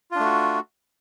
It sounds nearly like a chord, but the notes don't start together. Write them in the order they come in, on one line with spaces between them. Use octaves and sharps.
F4 D4 A3 F#4